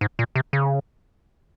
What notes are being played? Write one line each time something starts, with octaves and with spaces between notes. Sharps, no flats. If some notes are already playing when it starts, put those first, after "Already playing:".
G#2
A#2
C3
C#3